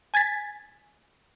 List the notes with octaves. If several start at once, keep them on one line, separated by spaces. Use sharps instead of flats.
G#5 G#6 A6 B6